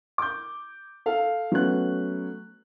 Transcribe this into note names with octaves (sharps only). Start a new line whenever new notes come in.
D6 G6
A4 F5
F#3 A3 B3 C#4 F#4 F#6